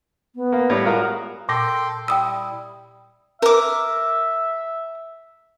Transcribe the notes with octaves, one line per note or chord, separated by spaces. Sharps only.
B3
A#3
A2 G3
G#3 F4 F#4 A#4
A#2 A4 G5 C6 A#6
G3 E4 G5 D#6 E6
A#4 E5 D6